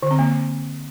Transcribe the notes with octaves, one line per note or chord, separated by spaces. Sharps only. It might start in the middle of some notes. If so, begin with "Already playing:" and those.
D3
C4
A#3